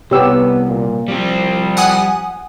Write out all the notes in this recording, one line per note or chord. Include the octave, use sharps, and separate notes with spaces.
C2 B3 G4 C#5 E6
A#2
F3 G3 C4
F#5 G#5 D#6